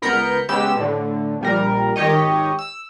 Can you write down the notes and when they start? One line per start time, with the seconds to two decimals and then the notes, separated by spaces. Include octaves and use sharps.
0.02 C#2 B3 A#4 B5 G6 C#7
0.49 C#3 G#3 B3 G4 E6 E7
0.76 A2 D3
1.41 A#1 G3 A#4
1.96 G#1 D#3 G4 C#5 D#5
2.59 E6